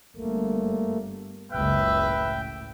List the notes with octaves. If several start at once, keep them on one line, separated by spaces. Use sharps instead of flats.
G1 A3 A#3
F#1 C#2 B4 E5 G5
A2